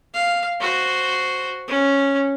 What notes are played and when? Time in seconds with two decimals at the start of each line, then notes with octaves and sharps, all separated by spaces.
0.14 F5
0.60 F#4 C5
1.68 C#4